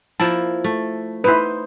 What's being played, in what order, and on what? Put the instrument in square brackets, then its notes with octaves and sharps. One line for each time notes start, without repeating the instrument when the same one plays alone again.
[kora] F3 A#3 E4 [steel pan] A5
[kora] A3
[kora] D#4 C5 [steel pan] E4 B4